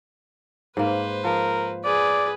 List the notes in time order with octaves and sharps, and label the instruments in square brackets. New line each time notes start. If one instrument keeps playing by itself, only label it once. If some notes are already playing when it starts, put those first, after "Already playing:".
[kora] G#2 A#3 [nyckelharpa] B4 C5
[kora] F3 [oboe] A#4
[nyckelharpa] G#4 B4 [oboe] D5